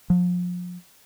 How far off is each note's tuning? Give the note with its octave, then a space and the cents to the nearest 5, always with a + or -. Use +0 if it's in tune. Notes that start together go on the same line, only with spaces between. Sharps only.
F3 +35